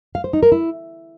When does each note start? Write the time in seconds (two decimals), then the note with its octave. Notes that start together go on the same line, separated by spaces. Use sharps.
0.15 F5
0.24 C5
0.33 D#4
0.43 A#4
0.52 E4